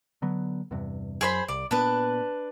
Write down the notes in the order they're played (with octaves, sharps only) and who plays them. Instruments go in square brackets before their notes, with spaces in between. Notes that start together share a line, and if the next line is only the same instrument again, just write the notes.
[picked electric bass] D3 F#3 B3
E2 G2 C3
[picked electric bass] F#2 [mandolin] G#4 C5 B5
[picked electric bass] C2 [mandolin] D5
[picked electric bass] A#2 B3 [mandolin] D4 B4